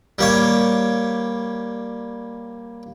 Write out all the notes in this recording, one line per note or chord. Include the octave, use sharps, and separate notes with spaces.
G3 A#3 C#5